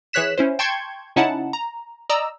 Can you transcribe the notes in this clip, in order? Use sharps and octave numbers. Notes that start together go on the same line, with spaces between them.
E3 G#4 C#5 F#6 B6 E7
C#4 E4 C5
G5 A5 C6 C#6 G6 G#6
C#3 C#4 D#4 E4 F#5 A5
A#5
D5 D#5 A#5 E6